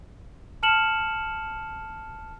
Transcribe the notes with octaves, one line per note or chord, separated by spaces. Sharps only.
A5 F6 C#7 E7 F#7